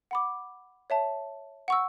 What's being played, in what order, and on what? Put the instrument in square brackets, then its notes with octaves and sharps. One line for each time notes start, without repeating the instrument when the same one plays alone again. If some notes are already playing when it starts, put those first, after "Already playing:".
[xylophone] F#5 B5 D6
C#5 E5 A5
F#5 C#6 E6